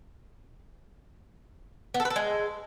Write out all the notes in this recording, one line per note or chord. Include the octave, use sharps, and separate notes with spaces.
B3
A4
B4
A4
G#3